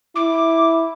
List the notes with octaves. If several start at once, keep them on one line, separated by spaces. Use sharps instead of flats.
E4 D6